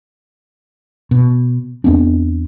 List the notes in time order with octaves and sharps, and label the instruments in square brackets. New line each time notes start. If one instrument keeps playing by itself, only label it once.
[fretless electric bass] B2
E2 B3 C4 D4